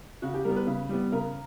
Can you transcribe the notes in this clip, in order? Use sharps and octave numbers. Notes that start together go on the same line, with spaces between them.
C#3 F#4
G4
G3 B3 A#4
B4
C#3
G3 B3
C#3 A#4